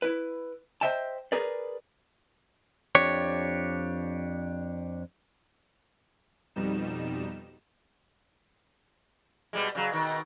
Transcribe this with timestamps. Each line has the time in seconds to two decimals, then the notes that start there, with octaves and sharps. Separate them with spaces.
0.02 E4 B4
0.81 C5 D#5 E5 G5 A5
1.32 G#4 A#4 B4 D5
2.95 F2 D4 G4 C#5
6.56 F2 B2 G3 D#4 E7
9.53 B2 G3 G#3
9.75 C#3 F#3
9.91 B2 D#3